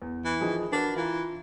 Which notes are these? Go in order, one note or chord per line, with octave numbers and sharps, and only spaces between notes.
E2
E3
D#3 F3 G#4
D4 F#4 A#4 B4
E3 F4 F5 A#5